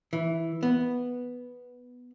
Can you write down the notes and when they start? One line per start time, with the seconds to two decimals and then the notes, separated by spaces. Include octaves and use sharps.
0.13 E3
0.63 B3